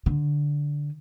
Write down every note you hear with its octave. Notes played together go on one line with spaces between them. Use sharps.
D3